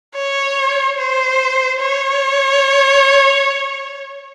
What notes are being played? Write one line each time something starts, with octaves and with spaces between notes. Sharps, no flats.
C#5
C5
C#5